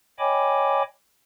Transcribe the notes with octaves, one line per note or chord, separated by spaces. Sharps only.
C#5 D#5 G5 G#5 B5 D6